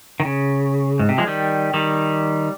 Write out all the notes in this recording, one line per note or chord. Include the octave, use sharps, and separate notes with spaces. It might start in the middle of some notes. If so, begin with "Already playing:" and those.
D#3
C#3
G#2
C3
F3 G#3
D#3 G3
D#3 G3